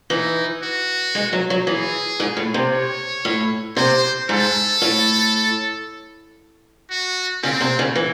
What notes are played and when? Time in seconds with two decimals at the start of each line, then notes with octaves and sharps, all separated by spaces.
0.10 E3 D#4
0.63 F#4
1.15 G#3
1.33 F#3
1.50 F#3
1.67 E3 G#4
2.20 G#2
2.37 A2
2.54 C3
2.72 C#5
3.25 A2
3.76 C3 C5
4.29 G#2 A4
4.82 A2
6.91 F#4
7.43 C#3 C4
7.61 C3
7.79 C#3
7.96 E3